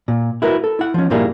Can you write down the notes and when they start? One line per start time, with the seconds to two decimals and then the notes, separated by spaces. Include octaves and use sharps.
0.08 A#2
0.42 E4 F#4 A#4 B4
0.64 A4
0.79 E4 F#5
0.94 F3 C#4
1.10 G2 A#2 G3 A#3 E4 G#4